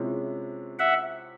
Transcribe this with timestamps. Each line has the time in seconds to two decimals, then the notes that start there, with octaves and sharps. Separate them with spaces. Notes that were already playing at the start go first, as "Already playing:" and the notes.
Already playing: C3 F3 G#3 C#4 E4
0.79 E5 F#5